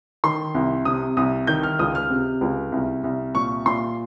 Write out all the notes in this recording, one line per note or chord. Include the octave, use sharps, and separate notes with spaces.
D#3 C6
C2
C3 D#6
C2 D#6
D#3 G6
F6
C#2 D#6
F6
C3
C#2
C2
C2
A#2 C#6
A#2 C6